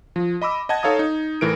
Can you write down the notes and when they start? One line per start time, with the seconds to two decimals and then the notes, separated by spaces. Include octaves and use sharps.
0.16 F3
0.42 D#5 B5 D6 E6
0.69 D#5 F#5 A5 G#6
0.83 D#4 A4 C#5 F5 A#5 D#6
0.99 D#4
1.41 A2 E3 A#4 D7